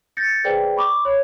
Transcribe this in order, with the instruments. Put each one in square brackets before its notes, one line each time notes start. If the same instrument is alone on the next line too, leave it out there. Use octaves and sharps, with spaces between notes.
[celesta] G6 A6 A#6 C#7
G#4 B4 C5 D5 G5
B5 C#6 D6
C#5